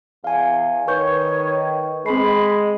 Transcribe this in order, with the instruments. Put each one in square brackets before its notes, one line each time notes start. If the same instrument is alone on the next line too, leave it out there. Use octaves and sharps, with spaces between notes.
[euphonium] E2 [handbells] F5 G#5
[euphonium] D#3 [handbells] B4 C#6 G6 [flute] C#5
[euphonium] G#3 [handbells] C4 C7 [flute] B5